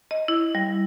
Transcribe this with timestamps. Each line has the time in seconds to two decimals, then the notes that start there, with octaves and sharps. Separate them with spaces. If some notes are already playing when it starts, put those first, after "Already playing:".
0.11 D#5
0.28 E4
0.55 G3